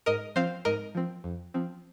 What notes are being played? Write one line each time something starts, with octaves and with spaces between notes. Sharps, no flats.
G#2 A#4 D#5
F3 C4 C5 F5
G#2 A#4 D#5
F3 C4
F2
F3 C4